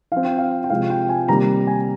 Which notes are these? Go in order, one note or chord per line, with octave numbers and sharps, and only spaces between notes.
F3 C4 F5
G5
F5
G5
C3 F3 G#3 C4 F5
G5
G#5
C3 D#3 G3 A#3 A#5
G#5